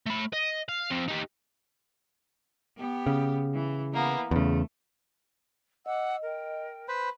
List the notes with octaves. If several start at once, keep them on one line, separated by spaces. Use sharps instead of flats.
A3 B5
D#5
F5
F3 C4
D#4 G4
B3 G4
C#3
E3
E3 A#3 B3
E2 C#3 A3
D#5 F#5 D6 E6
A#4 G5
B4 C5 B5